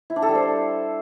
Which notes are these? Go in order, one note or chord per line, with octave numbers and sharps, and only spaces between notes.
E4
D4
A4
G3
C5